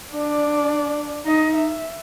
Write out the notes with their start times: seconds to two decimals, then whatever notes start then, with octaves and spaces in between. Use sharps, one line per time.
0.13 D4 D5
1.25 D#4 D#5
1.55 E5